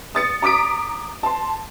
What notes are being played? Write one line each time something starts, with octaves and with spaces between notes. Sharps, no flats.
D#6 A6 C#7
A#5 D6 D#6 B6 D7
A5 C6